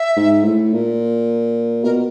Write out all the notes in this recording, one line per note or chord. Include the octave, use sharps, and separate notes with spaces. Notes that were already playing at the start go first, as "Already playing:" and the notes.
Already playing: E5
G#2
A2
A#2
B2 A#4